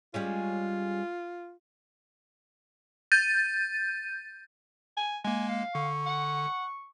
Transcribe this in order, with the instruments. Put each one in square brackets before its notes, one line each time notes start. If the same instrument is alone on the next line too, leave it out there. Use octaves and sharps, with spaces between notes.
[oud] G3 G#3 C#4 [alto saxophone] F4
[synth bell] G6 A6 D#7
[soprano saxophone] G#5
[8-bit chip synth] G#3 A#3 [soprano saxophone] G#5
[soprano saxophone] F5
[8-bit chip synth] D3 [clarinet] C#6
[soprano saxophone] F#5